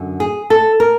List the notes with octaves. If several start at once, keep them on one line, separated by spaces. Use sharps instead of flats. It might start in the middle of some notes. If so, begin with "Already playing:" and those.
Already playing: F#2 D3
G#4
A4
A#4